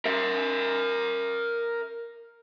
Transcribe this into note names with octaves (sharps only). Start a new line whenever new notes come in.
A#4 E5